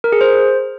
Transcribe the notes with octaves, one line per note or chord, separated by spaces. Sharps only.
A#4
G#4
C5